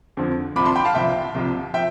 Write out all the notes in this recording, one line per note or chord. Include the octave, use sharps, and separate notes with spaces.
F2 D3 F3 C4
C2 C3 F3 B5 D6
A5 C6
G5 B5
F5 A5
C2 C3 F3 E5 G5
C2 C3 F3
F3 E5 G5